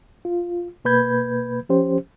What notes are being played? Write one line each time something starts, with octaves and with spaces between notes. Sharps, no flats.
F4
B2 A#3 B4 B5 G6 G#6
F3 C#4 G4 C5